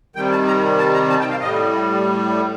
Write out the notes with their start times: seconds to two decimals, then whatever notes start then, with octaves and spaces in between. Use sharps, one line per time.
0.16 C3 D#3 G3 G5
0.31 A5
0.47 A#5
0.78 A5
0.94 A#5
1.09 A5
1.20 G5
1.30 F5
1.40 A2 G3 D#5